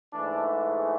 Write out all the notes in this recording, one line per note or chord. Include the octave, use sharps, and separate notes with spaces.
G#2 E3 A3 D4